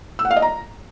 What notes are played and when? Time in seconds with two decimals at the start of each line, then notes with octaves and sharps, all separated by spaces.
0.19 E6
0.25 F#5
0.31 F5
0.36 D#5
0.42 A#5